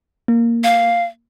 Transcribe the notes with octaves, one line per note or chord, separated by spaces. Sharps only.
A#3
F5